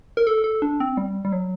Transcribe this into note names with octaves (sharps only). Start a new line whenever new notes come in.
A#4
A4
A4
D4
C4
G3
G3
F#3